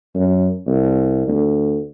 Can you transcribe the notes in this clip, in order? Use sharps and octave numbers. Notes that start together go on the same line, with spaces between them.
F#2
C2
D2